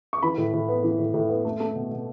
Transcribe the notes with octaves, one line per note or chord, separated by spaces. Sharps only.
C#6
E3 B5
A2
A2
B3
E3
A2
A2
B3
A3
A3
B2
B2